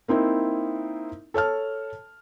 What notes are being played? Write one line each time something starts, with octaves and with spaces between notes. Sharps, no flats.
A#3 C4 D#4 E4
A4 C#5 A5 F6